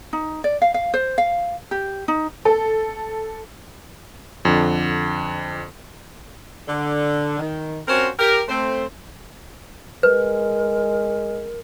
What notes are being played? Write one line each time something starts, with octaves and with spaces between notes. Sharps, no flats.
D#4
D5
F5
F5
C5
F5
G4
D#4
A4
F2 D3
D3
D#3
C4 C#4 F4 F#4 A#4 C5
G4 A#4
A3 C4 C5
G#3 A#4 B4